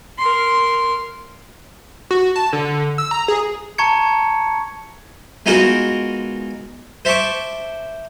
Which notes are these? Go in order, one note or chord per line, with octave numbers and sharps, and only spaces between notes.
A#4 C6
F#4
A5
D3
E6
A#5
G#4
A5 A#5 C#6 G#6 C#7
G#3 B3 D#4 F4 F#4 A#4
C5 E5 A5 C#6 D6